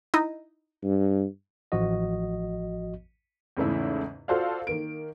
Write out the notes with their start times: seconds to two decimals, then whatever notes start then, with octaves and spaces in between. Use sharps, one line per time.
0.14 D#4 E4 D#5
0.84 G2
1.72 A1 F3 F#4 D#5
3.57 E2 G#2 C#3 A3 E4 E5
4.28 F4 F#4 A4 C5 D5 F5
4.67 D#3 A#3 D7